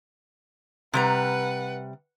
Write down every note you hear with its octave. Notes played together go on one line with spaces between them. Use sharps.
C3 G3 B4 F#5 A#5